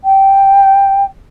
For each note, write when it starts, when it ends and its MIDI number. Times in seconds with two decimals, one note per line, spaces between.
0.04 1.04 79